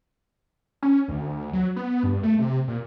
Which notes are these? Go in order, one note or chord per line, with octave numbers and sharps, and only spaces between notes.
C#4
D2
F#3
B3
G2
A3
C3
A#2